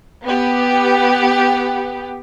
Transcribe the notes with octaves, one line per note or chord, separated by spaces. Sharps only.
B3 G4